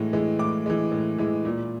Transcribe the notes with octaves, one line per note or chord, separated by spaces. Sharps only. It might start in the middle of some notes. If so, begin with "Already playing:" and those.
Already playing: A2 E3 G#3
E3 G#3
A2 D6
E3 G#3
A2
E3 G#3
A#2